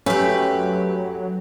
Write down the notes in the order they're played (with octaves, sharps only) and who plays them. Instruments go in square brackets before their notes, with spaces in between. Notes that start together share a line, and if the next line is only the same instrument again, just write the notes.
[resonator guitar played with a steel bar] F#2 A3 [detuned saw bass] F#3 [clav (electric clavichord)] C#4 [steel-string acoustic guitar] G4 B4